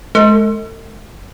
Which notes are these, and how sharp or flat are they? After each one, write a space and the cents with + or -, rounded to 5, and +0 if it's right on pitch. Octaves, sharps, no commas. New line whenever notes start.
G#3 +35 A4 +40